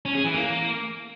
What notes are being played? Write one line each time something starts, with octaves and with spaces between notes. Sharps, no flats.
C#4
G#4
E3
A#3